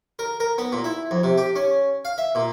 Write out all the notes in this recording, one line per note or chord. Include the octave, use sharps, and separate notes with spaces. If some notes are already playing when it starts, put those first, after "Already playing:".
A#4
A#4
B3
A#2
E4
F2
C3
G4
C#4
F5
E5
A#2